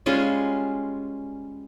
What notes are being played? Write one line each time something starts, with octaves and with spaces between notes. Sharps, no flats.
G3 G#3 C#4 F4